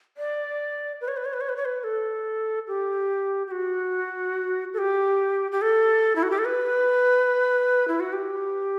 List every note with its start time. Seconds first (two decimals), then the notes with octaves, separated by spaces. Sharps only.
0.17 D5
1.01 B4
1.08 C#5
1.17 B4
1.25 C#5
1.33 B4
1.41 C#5
1.49 B4
1.56 C#5
1.65 B4
1.84 A4
2.68 G4
3.47 G4
3.51 F#4
4.74 A4
4.78 G4
5.52 G4
5.61 A4
6.16 E4
6.23 F#4
6.31 G4
6.38 A4
6.45 B4
7.88 E4
8.00 F#4
8.13 G4